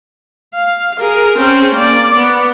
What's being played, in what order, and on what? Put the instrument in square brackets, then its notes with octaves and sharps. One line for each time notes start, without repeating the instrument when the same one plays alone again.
[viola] F5
G#4 A#4
C4 C#4
A#3 D5
B3